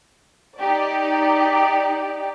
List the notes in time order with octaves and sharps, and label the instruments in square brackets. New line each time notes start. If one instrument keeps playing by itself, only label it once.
[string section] D#4 G4 D5